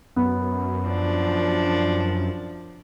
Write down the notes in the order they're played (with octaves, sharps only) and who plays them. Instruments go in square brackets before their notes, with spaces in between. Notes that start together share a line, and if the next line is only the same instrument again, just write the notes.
[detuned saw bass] F#2 [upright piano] B3
[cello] F3 D4